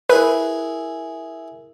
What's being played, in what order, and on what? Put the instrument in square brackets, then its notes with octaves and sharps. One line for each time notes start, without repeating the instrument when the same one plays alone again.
[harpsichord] E4 G#4 A#4 [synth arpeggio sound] B4